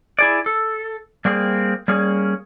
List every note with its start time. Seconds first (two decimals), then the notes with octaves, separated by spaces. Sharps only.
0.19 E4 G#4 D5
0.46 A4
1.25 G3 A#3 C4 G#4
1.88 G3 A#3 C#4 G#4